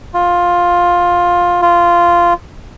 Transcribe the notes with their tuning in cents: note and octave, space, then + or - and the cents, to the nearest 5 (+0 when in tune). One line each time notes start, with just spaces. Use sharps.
F4 +10
F4 -10